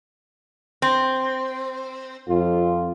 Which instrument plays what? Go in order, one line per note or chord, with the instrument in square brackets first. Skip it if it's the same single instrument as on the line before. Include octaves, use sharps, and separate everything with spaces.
[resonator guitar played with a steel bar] C4
[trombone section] F2 F4